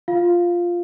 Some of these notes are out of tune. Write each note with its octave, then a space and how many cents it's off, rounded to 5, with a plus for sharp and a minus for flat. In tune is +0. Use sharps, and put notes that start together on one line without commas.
F4 +0 F5 +0